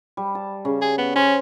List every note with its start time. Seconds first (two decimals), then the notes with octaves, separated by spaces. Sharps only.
0.17 G3
0.35 A5
0.65 C#3
0.82 G#4
0.98 B3
1.16 C#4 C5